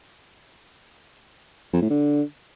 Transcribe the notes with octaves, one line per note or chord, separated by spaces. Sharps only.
F2
A2
D3